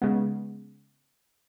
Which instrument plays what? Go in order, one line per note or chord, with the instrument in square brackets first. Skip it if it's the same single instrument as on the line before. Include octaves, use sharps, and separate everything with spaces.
[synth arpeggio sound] C#3 G#3 B3